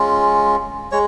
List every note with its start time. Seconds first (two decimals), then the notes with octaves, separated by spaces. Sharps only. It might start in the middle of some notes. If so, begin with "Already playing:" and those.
Already playing: G#3 C#4 F4
0.92 G#3 C#5